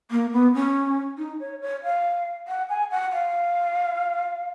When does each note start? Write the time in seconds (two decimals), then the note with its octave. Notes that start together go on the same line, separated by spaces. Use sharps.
0.11 A#3
0.33 B3
0.54 C#4
1.18 D#4
1.40 C#5
1.62 C#5
1.83 F5
2.48 F#5
2.69 G#5
2.91 F#5
3.13 F5